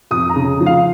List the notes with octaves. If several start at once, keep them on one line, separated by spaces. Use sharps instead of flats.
F2 D#6
A#5
C#3
F3
F5